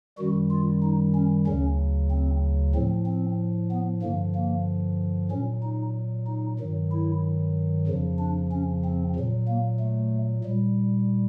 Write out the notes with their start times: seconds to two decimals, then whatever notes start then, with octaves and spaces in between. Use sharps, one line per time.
0.18 F#2 D#3 G3 F#4
0.51 F4
0.83 D#4
1.15 C#4
1.47 D2 C#3 F#3 C#4
2.11 C4
2.75 A2 F3 C4
3.06 C4
3.71 B3
4.02 G2 D3 F3 A#3
4.35 A#3
5.31 A#2 F#3 C#4
5.63 D#4
6.27 D#4
6.59 G2 D#3 F#3
6.92 E4
7.87 F2 C#3 F3
8.19 D4
8.52 C#4
8.84 C4
9.16 A#2 F#3
9.48 A#3
9.80 A3
10.44 A#2 G3